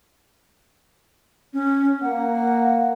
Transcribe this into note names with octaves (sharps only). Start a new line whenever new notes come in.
C#4
A#3 F#5